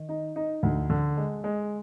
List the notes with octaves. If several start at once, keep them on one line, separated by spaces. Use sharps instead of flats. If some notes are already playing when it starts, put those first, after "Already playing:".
Already playing: D#3
D#4
D#4
D2
D3
G#3
G#3